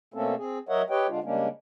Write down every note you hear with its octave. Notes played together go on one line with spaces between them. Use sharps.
B2 A3 A#3 C4 C#4 A4
C4 G#4
F#3 A#4 C#5 D#5 E5 F#5
G4 B4 C#5 D#5 G5
D3 G#3 D4 F4
C#3 G3 G#3 A#3 C#4 D4